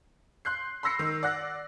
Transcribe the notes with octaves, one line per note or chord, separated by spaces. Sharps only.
C6 F#6 G6 C7
B5 C6 E6 A#6 C7 C#7
D#3
D5 F#5 F#6 A#6